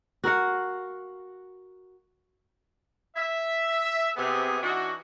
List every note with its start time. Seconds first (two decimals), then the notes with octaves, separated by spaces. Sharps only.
0.24 F#4 A#4 F5 F#5
3.16 E5
4.17 C3 B3 G#4
4.62 E3 D4 D#4 F#4